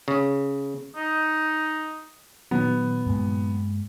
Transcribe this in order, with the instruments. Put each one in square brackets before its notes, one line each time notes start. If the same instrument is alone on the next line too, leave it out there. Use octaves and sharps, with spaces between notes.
[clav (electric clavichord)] C#3
[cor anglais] D#4
[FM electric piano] A#2 D#3 F#3 [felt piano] B3
[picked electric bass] G2 G#3 A#3